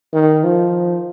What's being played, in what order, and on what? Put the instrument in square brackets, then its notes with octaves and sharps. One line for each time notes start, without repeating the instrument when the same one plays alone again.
[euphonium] D#3
F3